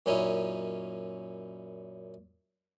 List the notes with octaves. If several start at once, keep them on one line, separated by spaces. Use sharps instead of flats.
F#2 A#2 C#4 D#4 E4